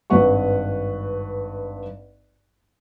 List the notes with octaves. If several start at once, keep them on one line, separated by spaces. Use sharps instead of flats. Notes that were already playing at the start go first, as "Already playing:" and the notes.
G#1 G2 B4 F#5 C#6